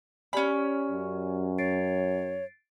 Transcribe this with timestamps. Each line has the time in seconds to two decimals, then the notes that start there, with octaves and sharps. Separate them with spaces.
0.33 C#4 G4 D5 G#5 B5
0.92 F#2
1.58 C#5 A6 C7 D7